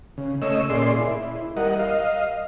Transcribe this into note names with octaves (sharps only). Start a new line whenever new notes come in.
C#3
C#3 A3 C#5 D#5 E6
A#2 C#4 G#4 D5 C6
E4
G3 A#4 D#5 F#5
D#5 F5